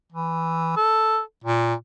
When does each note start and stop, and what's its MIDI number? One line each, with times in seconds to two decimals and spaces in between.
0.12 0.73 52
0.76 1.21 69
1.44 1.74 46